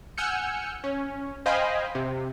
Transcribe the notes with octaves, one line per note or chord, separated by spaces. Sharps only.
F#5 G#5 E6 F6 G6 C#7
C#4
C5 D#5 F5 G5 G#5 B5
C3